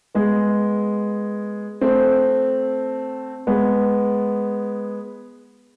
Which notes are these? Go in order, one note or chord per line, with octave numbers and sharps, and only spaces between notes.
G#3 B3
A3 C4
G#3 B3